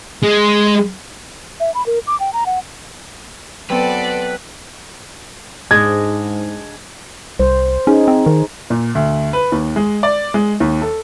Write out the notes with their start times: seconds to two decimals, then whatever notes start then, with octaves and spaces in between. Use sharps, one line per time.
0.23 G#3
1.60 E5
1.74 B5
1.86 A#4
2.07 D6
2.20 G5
2.33 A#5
2.46 F#5
3.70 F#3 B3 C4 A4 B4 D5
5.71 G#2 G#3 D4 D#5 G#6
7.40 C2 C5
7.87 C#4 D#4 G#4
8.08 C4
8.26 D#3
8.70 A#2
8.95 D2
9.33 B4
9.52 D#2
9.76 G#3
10.03 D5
10.34 G#3
10.60 D#2
10.82 A4